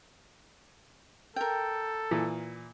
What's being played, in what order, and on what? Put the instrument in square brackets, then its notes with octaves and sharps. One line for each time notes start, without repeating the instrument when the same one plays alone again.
[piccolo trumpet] A4 [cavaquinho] A#4 G5
[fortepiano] A#2 E3